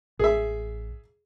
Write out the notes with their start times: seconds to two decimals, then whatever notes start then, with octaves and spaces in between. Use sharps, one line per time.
0.19 A1 G#4 E5